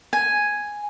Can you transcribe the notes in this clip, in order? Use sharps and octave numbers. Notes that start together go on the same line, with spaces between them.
G#5